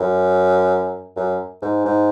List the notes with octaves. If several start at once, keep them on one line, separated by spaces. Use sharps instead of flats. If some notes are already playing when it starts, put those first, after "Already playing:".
Already playing: F#2
F#2
G#2
G#2